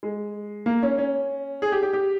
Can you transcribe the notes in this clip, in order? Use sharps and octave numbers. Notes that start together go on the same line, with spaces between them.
G#3
A#3
C#4
C#4
G#4
G4
G4
G4